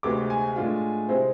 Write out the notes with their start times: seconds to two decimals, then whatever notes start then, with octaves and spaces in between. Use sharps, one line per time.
0.03 D2 C3 G#3 B3 D6
0.30 G#5
0.56 A2 G#3 D4 F4
1.08 C3 G#3 C4 E4 C5